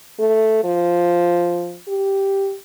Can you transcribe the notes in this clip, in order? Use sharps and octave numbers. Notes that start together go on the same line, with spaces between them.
A3
F3
G4